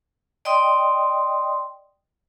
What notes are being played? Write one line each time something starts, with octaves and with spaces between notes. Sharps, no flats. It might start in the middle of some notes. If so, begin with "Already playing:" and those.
D5 D#5 G5 C6 D#6